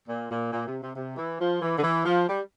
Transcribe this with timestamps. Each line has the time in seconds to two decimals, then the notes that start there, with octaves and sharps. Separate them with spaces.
0.08 A#2
0.30 A#2
0.52 A#2
0.67 C3
0.82 C3
0.96 C3
1.17 E3
1.40 F3
1.62 E3
1.78 D3
1.83 E3
2.05 F3
2.28 G3